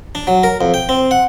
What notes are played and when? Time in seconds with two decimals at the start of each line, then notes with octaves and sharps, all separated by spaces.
0.15 D4
0.27 F#3
0.43 A#4
0.61 F2
0.74 G5
0.89 C4
1.11 F#5